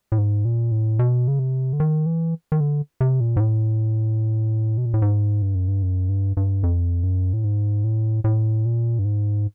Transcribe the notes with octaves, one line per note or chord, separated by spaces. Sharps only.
A2
G#2
A#2
A2
B2
C#3
C3
D3
D#3
E3
D#3
D3
C3
A#2
G#2
A2
B2
A#2
A2
G#2
G2
F#2
G2
F#2
G2
G2
F2
F#2
A2
G#2
A2
A2
A#2
G2
G#2